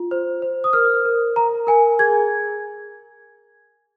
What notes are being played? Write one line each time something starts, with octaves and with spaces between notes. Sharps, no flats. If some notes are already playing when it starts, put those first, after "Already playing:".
Already playing: F4
C5
C5
D#6
A#4 F6
A#4
A#4 A#5
A#4 G#5
G#4 G#6